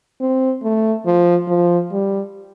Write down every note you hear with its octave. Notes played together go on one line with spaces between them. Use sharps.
C4
A3
F3
F3
G3